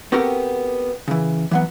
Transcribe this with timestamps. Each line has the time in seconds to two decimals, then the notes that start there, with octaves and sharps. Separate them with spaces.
0.12 B3 C4 F#4 G4 A4 A#4
1.08 C#3 E3
1.51 E3 F#3 B3